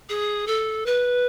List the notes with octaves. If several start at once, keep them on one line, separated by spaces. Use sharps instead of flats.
G#4
A4
B4